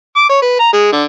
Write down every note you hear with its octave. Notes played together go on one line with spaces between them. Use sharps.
D6
C#5
B4
A#5
G#3
D3